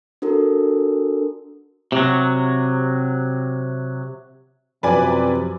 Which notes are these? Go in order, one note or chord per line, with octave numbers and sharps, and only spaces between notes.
D4 F#4 A4 A#4
C3 F#3
F#2 C3 F3 B4 D5 G#5